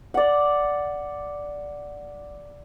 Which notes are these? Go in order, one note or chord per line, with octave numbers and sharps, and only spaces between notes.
D5 F#5